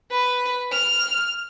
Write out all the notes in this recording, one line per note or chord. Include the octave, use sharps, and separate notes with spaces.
B4
F6